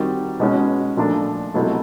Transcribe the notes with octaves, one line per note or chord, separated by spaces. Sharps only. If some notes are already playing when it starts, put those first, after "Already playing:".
Already playing: D#3 G3 C4 D#4 F#4
B2 G#3 C#4 F#4
A#2 F3 A3 D4 F4
C2 B2 F#3 A3